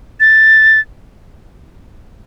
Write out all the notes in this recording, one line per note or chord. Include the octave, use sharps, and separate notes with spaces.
A6